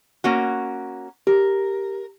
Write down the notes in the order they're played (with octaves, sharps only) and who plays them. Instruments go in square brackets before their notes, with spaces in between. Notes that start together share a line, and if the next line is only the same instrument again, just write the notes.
[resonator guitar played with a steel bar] A#3 C#4 F#4
[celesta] G4 [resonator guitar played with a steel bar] A#4